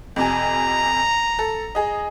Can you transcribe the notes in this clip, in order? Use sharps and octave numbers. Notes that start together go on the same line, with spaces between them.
F2 C3 G#5 A#5
A4
G#4 D#5